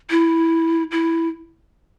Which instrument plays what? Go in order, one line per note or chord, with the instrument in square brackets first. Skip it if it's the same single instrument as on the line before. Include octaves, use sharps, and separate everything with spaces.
[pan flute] E4
E4